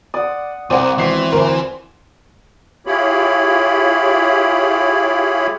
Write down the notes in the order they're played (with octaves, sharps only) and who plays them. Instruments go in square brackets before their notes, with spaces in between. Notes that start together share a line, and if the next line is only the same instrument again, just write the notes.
[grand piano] D5 [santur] F#5 D#6
[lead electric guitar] C2 [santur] C4 D5 [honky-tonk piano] C5 F#5 [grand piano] D#7
[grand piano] G#1 B3 C7 [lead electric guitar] E3
[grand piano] D2 [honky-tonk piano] A#4 C5
[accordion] E4 F4 G4 G#4 C#5 B5